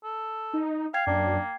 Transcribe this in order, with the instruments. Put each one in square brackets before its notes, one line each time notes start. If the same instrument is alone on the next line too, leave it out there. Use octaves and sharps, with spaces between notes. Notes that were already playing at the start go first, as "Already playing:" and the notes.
[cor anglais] A4
[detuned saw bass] D#4
[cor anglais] F5 [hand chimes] G5 G#6 C7
[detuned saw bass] F#2 [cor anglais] A#3 [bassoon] D4